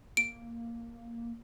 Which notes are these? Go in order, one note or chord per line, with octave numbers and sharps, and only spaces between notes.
A#3 D7